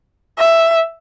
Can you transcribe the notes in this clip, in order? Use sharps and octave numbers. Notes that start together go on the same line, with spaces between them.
E5